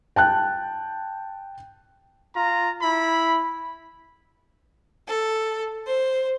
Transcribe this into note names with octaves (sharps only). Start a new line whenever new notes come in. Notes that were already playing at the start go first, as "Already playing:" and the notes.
G5 A5 F#6
F4 A#5
E4 B5
A4
C5